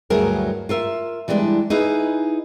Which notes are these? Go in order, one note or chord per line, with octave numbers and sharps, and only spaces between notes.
D2 G2 F#3 E4 G#4 A#4
F4 A#4 E5
E3 G3 G#3 C4 D4
D#4 E4 G#4 B4